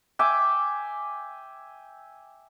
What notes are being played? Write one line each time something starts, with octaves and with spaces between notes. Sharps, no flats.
E5 G5 G#5 D6